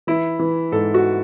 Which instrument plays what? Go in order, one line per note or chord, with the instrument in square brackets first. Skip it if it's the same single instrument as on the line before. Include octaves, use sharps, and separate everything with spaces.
[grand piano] E3 E4
E3
G#2 A4
F#4